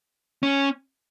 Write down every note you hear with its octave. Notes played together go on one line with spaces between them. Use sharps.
C#4